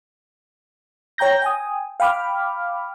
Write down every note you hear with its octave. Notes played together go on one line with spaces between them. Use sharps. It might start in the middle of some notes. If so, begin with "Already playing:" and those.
C#5 G5 A#5 G6 A#6
G5 G#5 D#6
F5 G5 B5 D6 F6